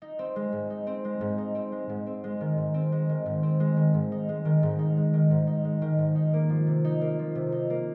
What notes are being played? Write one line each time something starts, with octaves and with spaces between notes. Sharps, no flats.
D#4
C4
G#3
G#2
D#4
C4
G#3
G#2
D#4
C4
G#3
G#2
C4
G#3
D#3
G#2
C4
G#3
D#3
G#2
C4
G#3
D#3
G#2
D#4
G#3
D#3
G#2
D#4
G#3
D#3
G#2
D#4
G#3
D#3
G#2
D#4
A#3
F3
C3
D#4
A#3
F3
C3
D#4
A#3